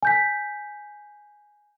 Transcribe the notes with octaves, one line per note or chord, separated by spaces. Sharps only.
G#5 G6 B6